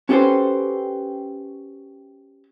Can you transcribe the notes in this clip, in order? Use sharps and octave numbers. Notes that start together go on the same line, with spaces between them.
C#4 F#4 G4 A4 B4 C5